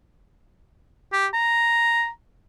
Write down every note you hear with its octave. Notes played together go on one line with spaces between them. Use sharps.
G4
A#5